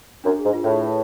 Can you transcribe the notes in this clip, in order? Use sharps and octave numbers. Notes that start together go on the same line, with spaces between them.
F#2 D4
G#2 G#4
F4
A2 G#4
B4